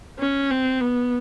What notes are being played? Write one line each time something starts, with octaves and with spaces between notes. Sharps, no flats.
C#4
C4
B3